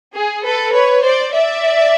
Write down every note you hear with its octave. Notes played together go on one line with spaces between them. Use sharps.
G#4
A4 B4
B4 C#5
C5 D5
D5 E5